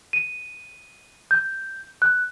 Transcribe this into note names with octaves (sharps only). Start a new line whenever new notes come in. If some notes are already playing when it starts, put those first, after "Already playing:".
D#7
G6
F#6